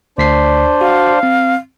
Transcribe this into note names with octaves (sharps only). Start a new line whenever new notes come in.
D2 D4 C5 D5 B6 C7
F#4 F5
C4